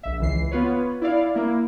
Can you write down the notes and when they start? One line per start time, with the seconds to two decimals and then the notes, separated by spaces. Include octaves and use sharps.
0.03 A#1 E5
0.19 C#2 E3 C7
0.51 B3 F4 B4 C#5
1.01 E4 D5 F5
1.35 A#3 E4